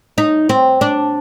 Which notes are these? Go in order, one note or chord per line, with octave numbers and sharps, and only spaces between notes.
D#4
C4
D4